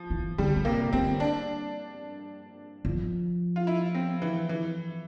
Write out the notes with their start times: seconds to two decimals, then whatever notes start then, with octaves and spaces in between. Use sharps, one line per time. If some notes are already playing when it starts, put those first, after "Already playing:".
Already playing: F3
0.10 E3
0.38 D3 G3
0.56 D3
0.65 C3 A#3
0.93 D3 C4
1.20 D4
2.85 F3
3.56 F4
3.67 E4
3.95 C4
4.22 E3
4.49 E3